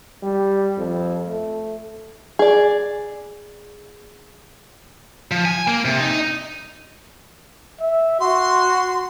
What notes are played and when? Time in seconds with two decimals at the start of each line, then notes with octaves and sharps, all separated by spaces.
0.23 G3
0.78 F2
1.28 A3
2.39 G#4 D5
5.31 F3
5.45 G#5
5.68 A#3
5.85 C3
6.00 D#4
7.81 E5
8.21 F#4 C6